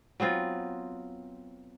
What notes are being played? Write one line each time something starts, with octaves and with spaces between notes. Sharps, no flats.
F#3 B3 C4 F4